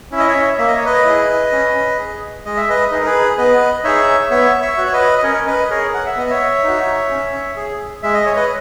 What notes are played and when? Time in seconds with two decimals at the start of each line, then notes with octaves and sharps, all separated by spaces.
0.12 C#4 E4 E5
0.20 D#5
0.27 C#5 E5
0.58 A#3 E5
0.67 D#5
0.76 C#5
0.85 B4 D#5
1.05 E4 G#4
1.52 C#4
1.99 G#4
2.45 G#3 D#5
2.57 E5
2.70 B4 D#5
2.91 D#4 G#4 B4
2.99 A#4
3.06 G#4 B4
3.38 B3 B4 D#5
3.84 D#4 G#4 C#5 E5
4.31 B3 C#5 E5
4.62 C#5 E5
4.78 F#4
4.86 C#5
4.93 B4 D#5
5.18 D#5
5.23 C#4 A#4 C#5
5.47 B4 D#5
5.70 G#4 A#4 C#5
5.94 F#5
6.06 E5
6.16 B3 D#5
6.30 C#5 E5
6.64 D#4 F#4
7.10 C#4
7.56 G#4
8.03 G#3 E5
8.14 D#5
8.26 C#5
8.36 B4 D#5